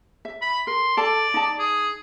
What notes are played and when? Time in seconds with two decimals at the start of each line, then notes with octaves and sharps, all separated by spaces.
0.25 E5
0.42 B5
0.67 A#4 C6
0.97 A4 D5 A5
1.34 D#4 A5
1.59 G#4